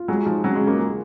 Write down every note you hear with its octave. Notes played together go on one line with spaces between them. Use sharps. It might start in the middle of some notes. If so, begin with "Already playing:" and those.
Already playing: F4
F#3 G#3
F3 D#4
C#3 F#3
G#3
C#3
A#3
G#3